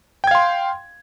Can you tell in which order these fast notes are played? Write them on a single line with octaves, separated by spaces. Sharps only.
G5 G#6 F5 C6